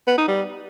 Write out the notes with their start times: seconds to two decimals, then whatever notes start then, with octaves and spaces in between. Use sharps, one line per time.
0.07 B3
0.18 D#4
0.28 G3